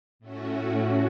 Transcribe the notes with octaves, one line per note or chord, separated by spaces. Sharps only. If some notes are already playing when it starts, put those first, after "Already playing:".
A2 A3 C#4 F#4